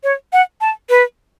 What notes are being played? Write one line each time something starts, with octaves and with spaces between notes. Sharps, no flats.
C#5
F#5
A5
B4